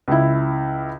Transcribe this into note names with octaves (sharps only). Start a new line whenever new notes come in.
C#2 E4